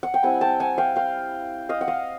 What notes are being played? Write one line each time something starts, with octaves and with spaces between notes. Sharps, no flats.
F#5
G5
G3 C4 E4 F#5 G#5
G5 A5
F#5 G#5
F5 G5
F5 G5
D#5 F5
F#5
D#5 F5